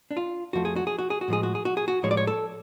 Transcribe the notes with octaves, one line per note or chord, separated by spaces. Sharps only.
D4
F4
F2 F3 A3 F#4
G#4
F#4
G#4
F#4
G#4
F#4
A2 F3 G#3 G#4
F#4
G#4
F#4
G#4
F#4
A2 F3 G#3 C#5
D5
C#5
A4